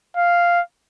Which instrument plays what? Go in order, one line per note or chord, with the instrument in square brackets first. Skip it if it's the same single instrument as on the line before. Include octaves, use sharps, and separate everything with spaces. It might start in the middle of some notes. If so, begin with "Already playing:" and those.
[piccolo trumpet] F5